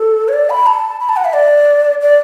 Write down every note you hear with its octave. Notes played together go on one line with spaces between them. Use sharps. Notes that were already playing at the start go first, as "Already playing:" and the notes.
Already playing: A4
C#5
D5
B5
A5
B5
A5
F#5
E5
D5
D5